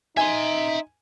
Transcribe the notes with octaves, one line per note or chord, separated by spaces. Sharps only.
D#4 E5 G#5 C6